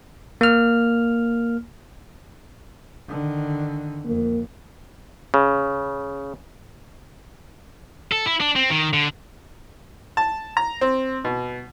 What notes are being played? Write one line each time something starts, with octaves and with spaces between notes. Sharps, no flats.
A#3 F6
D3 D#3
F2 A#3
C#3
A4
E4
D4
C4
D#3
D3
A5
A#5
C4
B2